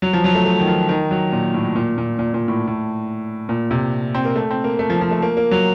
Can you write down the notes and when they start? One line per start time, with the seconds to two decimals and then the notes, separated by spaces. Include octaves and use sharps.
0.02 F#3
0.13 F3
0.24 F#3
0.35 A3
0.46 A3
0.60 D#3
0.67 F3
0.89 D#3
1.11 F#3
1.32 A#2
1.54 A2
1.76 A#2
1.98 A#2
2.19 A#2
2.34 A#2
2.48 A2
2.68 A2
3.49 A#2
3.71 C3
4.15 C4
4.25 A#3
4.36 A3
4.50 C4
4.64 A#3
4.79 A3
4.90 F3
5.01 F3
5.11 A3
5.22 A#3
5.37 A#3
5.51 F#3